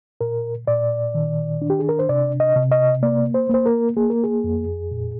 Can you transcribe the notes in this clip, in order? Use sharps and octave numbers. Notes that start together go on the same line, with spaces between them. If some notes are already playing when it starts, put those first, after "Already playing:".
A#2 A#4
A#2 D5
D#3
D4
G4
G#4
A#4
C5
C3 D5
D#5
C3
D#5
A#3 D5
C5
A#3 C5
A#4
A#3 G#4
A#4
G#4
F2
A#2